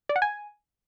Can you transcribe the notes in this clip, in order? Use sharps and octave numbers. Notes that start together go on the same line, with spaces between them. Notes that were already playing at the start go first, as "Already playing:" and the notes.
D5
F#5
G#5